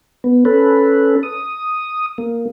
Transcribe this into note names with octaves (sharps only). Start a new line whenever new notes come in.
B3
C#4 A4 B4
D#6
A#3